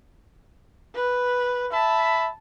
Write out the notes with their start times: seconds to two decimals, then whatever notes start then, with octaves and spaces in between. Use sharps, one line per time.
0.95 B4
1.72 E5 A5 B5